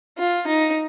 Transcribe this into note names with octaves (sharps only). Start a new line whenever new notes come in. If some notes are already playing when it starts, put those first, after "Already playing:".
F4
D#4